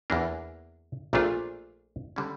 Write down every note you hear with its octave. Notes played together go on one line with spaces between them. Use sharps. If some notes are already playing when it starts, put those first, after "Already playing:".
E2 E3 A#3 D4
A#1 A#2 A3 D4 F4
D3 G3 C#4